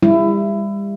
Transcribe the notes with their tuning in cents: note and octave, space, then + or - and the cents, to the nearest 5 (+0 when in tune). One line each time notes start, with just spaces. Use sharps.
G3 +40 E4 +20